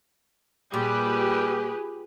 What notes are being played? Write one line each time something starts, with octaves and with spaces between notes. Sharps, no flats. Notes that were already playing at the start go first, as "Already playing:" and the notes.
A#2 G3 G4 G#4 B4